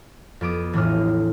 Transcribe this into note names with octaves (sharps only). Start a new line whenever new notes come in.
F2 B3 D6 D#6
E1 A2 E3 D4 D#6 F6